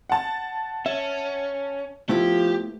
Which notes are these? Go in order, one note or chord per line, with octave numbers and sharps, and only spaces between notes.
F#5 A5
C#4 E5
F3 A3 B3 E4 G4